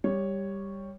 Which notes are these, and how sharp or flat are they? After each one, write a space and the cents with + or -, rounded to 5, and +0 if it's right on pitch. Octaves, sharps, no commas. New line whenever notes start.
G3 +10 C#5 +0